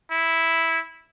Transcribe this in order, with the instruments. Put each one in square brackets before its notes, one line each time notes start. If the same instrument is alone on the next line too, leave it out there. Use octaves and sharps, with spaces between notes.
[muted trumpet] E4